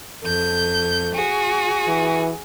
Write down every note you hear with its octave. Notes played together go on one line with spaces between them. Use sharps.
F2 A4 G6
F#4 G#4
E3